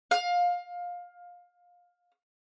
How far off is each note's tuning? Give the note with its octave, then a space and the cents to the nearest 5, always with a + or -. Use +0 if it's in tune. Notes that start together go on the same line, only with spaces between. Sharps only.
F5 +25